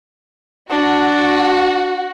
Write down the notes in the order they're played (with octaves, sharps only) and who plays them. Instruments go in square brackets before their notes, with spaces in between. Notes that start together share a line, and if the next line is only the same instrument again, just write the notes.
[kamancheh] D4 [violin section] F#4